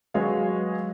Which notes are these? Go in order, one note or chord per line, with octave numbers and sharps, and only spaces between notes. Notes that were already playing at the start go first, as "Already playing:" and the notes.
F#3 G#3 G#4 B4 C#5 F5